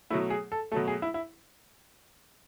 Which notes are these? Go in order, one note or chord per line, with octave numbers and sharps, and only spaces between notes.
B2 F#3 A3 E4
G#4
A4
B2 F#3 A3 A4
G#4
E4
E4